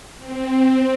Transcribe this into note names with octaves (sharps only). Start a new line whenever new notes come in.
C4